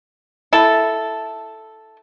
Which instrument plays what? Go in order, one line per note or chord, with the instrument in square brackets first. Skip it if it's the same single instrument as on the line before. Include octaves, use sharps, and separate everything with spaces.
[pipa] E4 A4